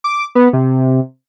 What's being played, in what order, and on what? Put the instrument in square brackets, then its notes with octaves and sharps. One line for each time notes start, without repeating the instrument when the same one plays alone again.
[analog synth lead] D6
B3
C3